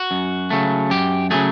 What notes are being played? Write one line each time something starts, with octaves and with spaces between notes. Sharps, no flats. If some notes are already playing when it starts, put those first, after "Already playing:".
Already playing: F#4
F#2
C#3 F#3 A3
F#2 G4
C#3 F#3 A3 G#4